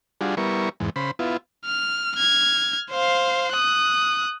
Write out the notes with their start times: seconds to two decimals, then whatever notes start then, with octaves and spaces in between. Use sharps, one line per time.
0.21 G3 D4 F4 F#4 G#4
0.37 G3 B3 E4 A#4 C#6
0.80 E2 G#2
0.96 C#3 C5 B5
1.19 B3 E4 F4
1.65 F6
2.16 F6 G#6
2.91 C5 F5
3.53 D#6 F#6